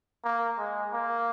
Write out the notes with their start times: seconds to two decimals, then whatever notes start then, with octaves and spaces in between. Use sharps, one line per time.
0.25 A#3
0.59 G#3
0.93 A#3